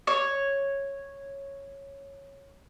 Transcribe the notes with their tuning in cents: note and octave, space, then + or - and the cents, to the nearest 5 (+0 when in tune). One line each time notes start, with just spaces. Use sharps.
C#5 -5